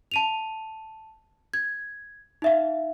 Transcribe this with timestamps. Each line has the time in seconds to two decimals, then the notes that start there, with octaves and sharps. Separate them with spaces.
0.11 A5 D#7 F7
1.54 G#6
2.42 D#4 E5 F5